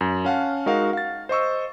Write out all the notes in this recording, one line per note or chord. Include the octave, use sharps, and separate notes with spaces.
F#2
C#4 F5 F#5 A5
G#3 D#4 F#4 A#4 F5 F#5
F5 A6
C5 D#5 C#6 E6